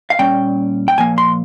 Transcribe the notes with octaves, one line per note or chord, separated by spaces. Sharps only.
F5
A#2 G3 A#3 C#4 G5
G5
A#2 F3 A#3 G#5
C6